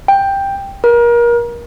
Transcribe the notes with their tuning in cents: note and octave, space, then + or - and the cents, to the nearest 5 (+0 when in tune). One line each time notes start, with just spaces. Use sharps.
G5 +10
A#4 +30